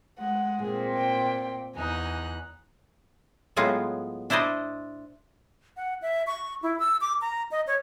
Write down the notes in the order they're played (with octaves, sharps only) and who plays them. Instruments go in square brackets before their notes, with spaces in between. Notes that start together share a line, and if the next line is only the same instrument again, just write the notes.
[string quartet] G#3 [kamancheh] F#5
[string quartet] A#2 C4 [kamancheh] G#4
[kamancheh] G5
[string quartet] E2 D#4 F#6 [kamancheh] G#5
[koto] A2 F#3 G#3 B3 F4
D4 E4 C5 D5 D#5
[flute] F#5
E5
C#6
E4
E6
D6
A#5
D#5
C#5